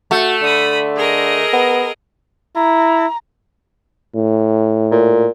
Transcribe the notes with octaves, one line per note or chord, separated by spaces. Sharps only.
A3 F#4
D3 B5 D#6
G#4 A#4 D#5
B3
E4 A#5
A2
A#2